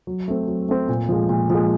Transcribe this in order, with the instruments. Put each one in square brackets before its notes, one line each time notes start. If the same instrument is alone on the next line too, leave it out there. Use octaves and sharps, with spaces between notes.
[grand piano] F#3
A3 C4
F#3
A3 C4
A#2
F3 G#3
A#2
F3 G#3